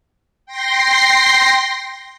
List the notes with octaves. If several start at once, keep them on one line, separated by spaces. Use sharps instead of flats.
G5 C6 A#6 C7